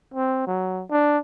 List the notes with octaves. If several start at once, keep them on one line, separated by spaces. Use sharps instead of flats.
C4
F#3
D4